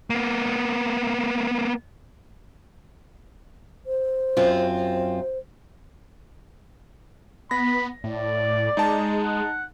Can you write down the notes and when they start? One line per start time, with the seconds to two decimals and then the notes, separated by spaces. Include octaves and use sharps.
0.10 A#3 B3
3.86 C5
4.37 F#2 C4 F4
7.51 B3 B5 A#6
8.04 A2 D5
8.77 G#3 D#4 A5
9.24 F#5